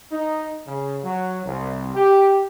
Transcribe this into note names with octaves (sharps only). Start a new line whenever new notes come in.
D#4
C#3
F#3
C2
G4